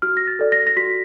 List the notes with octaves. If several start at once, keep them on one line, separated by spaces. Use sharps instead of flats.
F#4 F6
A#6
A6
A4 D5
A#6
A#6
F#4 B6